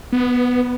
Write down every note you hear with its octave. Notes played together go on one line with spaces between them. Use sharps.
B3